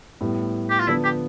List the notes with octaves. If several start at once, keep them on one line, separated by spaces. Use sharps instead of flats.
A2 G3 B3
G4
F4
D3 F3 B3 D4 E4
G4